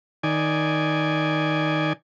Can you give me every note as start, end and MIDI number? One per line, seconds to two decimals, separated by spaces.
0.23 1.93 51
0.23 1.93 74
0.23 1.93 80